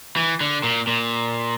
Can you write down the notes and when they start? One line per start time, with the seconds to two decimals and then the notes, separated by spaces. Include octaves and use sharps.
0.16 E3
0.41 D3
0.63 A#2
0.87 A#2